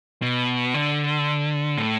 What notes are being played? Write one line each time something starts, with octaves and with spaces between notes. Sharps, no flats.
B2
D3
A2